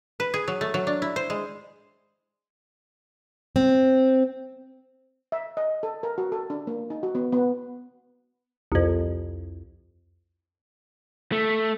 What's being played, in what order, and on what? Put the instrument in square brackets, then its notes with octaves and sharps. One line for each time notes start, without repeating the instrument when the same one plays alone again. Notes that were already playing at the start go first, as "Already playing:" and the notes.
[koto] B4
G#4
F#3
A3
F#3
D4
E4
C5
G#3
[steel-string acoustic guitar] C4
[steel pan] E5
D#5
A4
A#4
F#4
A4
D4
A#3
D#4
F#4
B3
B3
[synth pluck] C2 F2
[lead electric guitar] A3